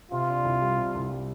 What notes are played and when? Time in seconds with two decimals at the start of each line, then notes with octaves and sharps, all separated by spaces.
0.12 C3 F4
0.29 D4
0.45 C2
0.62 G3
0.78 C3
0.95 C2
1.11 G3